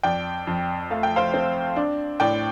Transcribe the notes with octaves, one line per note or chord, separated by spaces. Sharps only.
F2 D5 G5
F2
A3 F5
G5
C5 F5
C4
D4
A2 D5 G5